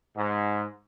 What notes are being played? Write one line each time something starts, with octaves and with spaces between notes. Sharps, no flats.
G#2